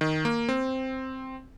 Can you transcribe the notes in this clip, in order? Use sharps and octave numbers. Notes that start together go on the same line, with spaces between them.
D#3
A#3
C4